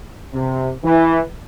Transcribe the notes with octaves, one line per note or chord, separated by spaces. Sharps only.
C3
E3